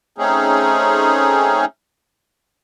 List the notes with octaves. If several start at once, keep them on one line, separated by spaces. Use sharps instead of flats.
A3 C4 C#4 D#4 G#4